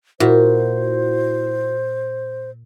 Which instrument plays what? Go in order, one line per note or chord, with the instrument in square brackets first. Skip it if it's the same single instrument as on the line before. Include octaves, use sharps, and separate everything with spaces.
[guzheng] A#2 [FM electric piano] E4 F#4 [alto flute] C5